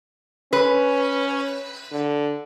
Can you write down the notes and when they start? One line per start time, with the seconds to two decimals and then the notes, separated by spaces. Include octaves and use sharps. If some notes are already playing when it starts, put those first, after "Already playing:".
0.53 C#4 B4
1.92 D3